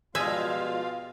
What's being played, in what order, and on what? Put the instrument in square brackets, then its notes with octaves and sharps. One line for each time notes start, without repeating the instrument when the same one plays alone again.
[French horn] B2 [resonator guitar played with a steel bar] F3 G3 G#3 [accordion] F4 F5 [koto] E5 G#5